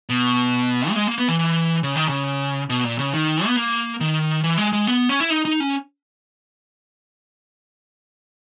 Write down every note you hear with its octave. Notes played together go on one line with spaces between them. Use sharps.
B2
A#3
G#3
A#3
B3
E3
E3
C#3
D#3
C#3
B2
A#2
C#3
D#3
B3
A#3
D#3
E3
G#3
G#3
B3
C#4
E4
D#4
D#4
C#4